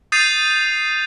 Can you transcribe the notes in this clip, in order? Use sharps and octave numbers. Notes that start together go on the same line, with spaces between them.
D#6 G6 A6 C7 D#7 F7